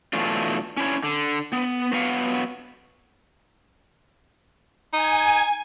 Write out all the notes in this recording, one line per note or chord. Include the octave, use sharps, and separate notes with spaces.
B2 E3 F#3 A3 D4 F4
C#4 D4 E4 C#5
D3
B3
F#3 B3 B4 F5 F#5
D#4 G#5